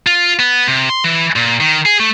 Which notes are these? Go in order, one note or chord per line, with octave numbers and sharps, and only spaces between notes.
F4
B3
C3
C6
E3
A#2
D#3
G#4
A3